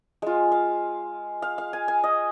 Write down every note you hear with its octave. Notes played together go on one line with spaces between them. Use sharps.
G#3 F4 G#5
F5
F5
F5
G#5
G#5
D#5